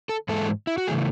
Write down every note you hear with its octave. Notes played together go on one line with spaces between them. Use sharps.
A4
G#2 E3 G#3 A4
E4
F#4
C#3 E3 A3 G#4